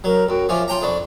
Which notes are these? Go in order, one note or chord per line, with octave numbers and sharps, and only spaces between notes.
F#3 A#4 A#5
F#2 F#4 G5
F3 C#4 F4 E5 D6
F4 C#5 G5 A5 A#5
F2 D4 B5 C#6